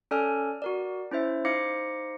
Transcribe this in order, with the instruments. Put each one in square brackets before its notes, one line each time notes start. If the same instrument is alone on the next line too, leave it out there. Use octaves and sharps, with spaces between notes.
[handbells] C#4 A4 D5 G#5 F6
F#4 A#4 D5
C#4 E4 C5 E5
D#4 C5 F5 D6 A#6 C#7